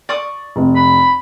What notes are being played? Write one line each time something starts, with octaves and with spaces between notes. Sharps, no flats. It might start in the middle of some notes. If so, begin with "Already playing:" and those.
D5 C#6 D#6
F1
B5